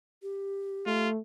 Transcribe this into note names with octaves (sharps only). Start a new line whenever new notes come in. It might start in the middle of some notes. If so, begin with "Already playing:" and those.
G4
A3 F4